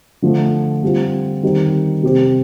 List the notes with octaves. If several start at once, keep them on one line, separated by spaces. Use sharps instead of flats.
D3 F3 A3
D3 G3 C4 F4
D#3 G3 C4
C3 G3 C4 G4